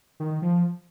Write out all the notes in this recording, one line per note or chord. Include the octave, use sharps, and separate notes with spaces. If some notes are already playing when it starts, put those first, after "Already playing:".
D#3
D#3
F3